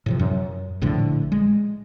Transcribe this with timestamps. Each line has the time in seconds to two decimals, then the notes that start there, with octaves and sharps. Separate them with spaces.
0.06 A2 C3 F3
0.19 F#2
0.81 A#1 A2 D3 F3
1.32 G#3